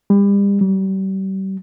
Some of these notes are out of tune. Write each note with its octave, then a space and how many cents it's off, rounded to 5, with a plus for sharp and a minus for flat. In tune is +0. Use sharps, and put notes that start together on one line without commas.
G3 +35
G3 -35